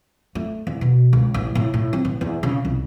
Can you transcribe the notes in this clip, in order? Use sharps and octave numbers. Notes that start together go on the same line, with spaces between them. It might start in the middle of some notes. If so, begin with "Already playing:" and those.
A3
E2
B2
C#2
A1
A2
A2
C4
A1
E2
C#3
C2